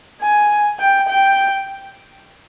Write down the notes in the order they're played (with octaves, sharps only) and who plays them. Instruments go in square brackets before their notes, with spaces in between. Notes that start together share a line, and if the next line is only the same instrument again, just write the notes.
[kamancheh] G#5
G5
G5